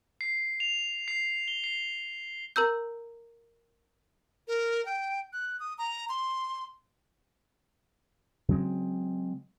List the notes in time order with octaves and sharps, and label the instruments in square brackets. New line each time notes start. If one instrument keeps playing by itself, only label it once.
[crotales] C7
F7
C7
G7
C7
[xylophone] A#4 A#5 E6 G6
[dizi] A#4
G5
F#6
D#6
A#5
C6
[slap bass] C#3 F#3 G#3 C4